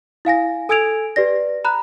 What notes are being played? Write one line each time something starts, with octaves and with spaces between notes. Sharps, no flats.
E4 F5 G#5 A#6
A4 G#5 E6 G#6 D7 F7
G4 B4 D5 A#6
A#5 B5 F#6